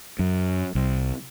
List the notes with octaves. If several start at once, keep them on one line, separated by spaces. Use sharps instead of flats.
F#2
C2